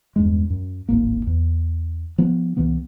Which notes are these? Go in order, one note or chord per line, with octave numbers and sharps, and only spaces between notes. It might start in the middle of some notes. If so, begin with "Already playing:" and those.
E2 G2 G#3
F#2
D1 G#1 A#3
E2
F3 B3
C#2 C3 E3 B3